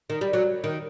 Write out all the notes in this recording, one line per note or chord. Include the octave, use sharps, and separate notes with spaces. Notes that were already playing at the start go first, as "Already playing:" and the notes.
D#3
G3
F#3
D#3